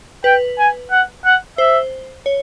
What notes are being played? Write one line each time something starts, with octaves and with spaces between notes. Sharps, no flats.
B4 G5
G#5
F#5
F#5
C5 E5
C#5